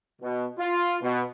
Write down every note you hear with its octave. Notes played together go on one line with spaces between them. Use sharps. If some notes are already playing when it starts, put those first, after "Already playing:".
B2
F4
B2